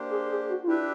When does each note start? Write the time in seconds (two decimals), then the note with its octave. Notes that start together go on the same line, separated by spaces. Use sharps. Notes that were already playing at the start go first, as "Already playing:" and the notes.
Already playing: A#3 D4 G4 C5
0.10 G#4
0.29 G#4
0.49 F#4
0.63 F4
0.68 D4 E4 G4 B4 E5